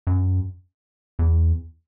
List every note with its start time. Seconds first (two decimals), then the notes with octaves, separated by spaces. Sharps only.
0.07 F#2
1.19 E2